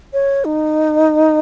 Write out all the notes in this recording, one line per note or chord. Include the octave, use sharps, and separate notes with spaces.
C#5
D#4